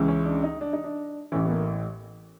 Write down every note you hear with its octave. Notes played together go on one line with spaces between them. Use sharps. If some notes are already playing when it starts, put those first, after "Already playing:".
Already playing: C#2 C#3 E3
C#4
D4
D#4
D4
D#4
D4
A1 A2 E3 C#4
B3
A#3